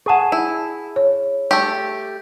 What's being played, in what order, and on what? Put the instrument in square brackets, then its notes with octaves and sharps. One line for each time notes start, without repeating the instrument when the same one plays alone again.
[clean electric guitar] G#4 G#5 A5 [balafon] F#5 C#6
[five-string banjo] E4
[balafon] C#5
[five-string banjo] A3 G4